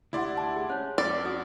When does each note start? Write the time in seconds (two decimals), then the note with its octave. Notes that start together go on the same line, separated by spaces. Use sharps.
0.13 D2 E4 G4 D5 F#5 C6
0.37 A5 D6
0.56 G#4
0.70 C#4 C5 C#5
0.98 F2 B4 D5
1.25 F#4 D#6